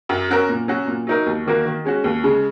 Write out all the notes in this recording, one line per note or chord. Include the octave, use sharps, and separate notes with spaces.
F#2
F#3 C#4 F#4 A#4
A#2
F#3 C#4 F#4
A#2
F#3 D#4 A#4
D#2
D#3 A#3 F#4 A#4
D#3
G#3 C#4 F#4
D#2
C#3 G#3